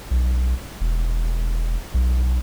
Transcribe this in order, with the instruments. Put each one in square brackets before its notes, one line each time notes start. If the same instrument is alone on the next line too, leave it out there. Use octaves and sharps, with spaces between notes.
[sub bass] B1
E1
B1